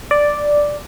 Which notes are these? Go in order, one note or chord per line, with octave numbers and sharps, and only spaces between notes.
D5